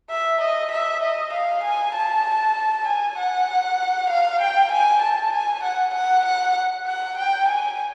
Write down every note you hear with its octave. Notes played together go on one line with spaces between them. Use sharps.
E5
D#5
E5
D#5
F5
G#5
A5
G#5
F#5
F5
G5
G#5
A5
G#5
F#5
F#5
F#5
F#5
G5
G#5